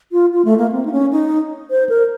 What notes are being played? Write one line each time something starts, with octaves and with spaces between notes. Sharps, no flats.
F4
F4
A3
A#3
C4
D#4
C#4
D#4
C5
A#4